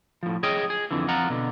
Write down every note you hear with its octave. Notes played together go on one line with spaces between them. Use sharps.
A2 F3
G#4 C#5 D#5 G5
G#4
F2 D3 E3
F2 F3 F4 F#5 A#5
B2 D3